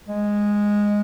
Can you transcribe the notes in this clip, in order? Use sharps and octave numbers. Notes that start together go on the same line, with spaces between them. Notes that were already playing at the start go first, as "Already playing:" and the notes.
G#3